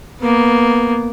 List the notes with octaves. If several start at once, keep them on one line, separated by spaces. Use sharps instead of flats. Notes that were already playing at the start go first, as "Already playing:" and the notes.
A#3 B3